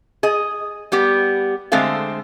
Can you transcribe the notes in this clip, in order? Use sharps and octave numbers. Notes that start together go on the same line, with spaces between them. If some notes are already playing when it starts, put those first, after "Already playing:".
G#4 D#5
G3 B3 G4
D3 G#3 A3 C4 A4 F5